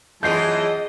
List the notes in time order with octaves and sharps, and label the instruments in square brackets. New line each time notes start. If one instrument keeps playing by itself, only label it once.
[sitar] F#2 E3 F4 [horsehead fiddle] G#4 A5 [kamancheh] D#5 [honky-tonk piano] G6 C7